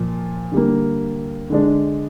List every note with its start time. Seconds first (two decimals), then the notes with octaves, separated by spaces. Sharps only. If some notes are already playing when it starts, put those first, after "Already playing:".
Already playing: A#2 F3
0.52 D3 G3 A#3
1.50 D3 G#3 D4